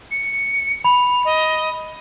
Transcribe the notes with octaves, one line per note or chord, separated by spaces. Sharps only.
C#7
B5 F7
D#5